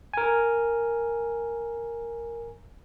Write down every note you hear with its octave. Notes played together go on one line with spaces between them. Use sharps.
A#4 G#5